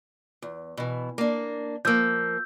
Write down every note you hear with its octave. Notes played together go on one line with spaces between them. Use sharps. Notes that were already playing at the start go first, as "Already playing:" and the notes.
E2
B2 E3
A#3 D4
F3 A#3 E6 G6